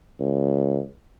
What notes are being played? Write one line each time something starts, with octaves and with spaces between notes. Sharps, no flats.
C#2